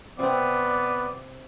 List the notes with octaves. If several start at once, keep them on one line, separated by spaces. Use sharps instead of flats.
C3 B3 C4 D5